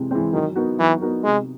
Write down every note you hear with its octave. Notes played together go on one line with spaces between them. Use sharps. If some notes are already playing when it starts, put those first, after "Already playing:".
Already playing: C3 E3 G#3 C4
E3 G#3 C4
D#3 F#3
B3 D#4 F#4 A#4
E3 F#3
B3 D#4 F#4 A#4
C3 G#3